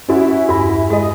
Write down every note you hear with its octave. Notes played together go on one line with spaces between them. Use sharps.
C#4 E4 F#4
E2 G2 E4
G#3 G#4 D#5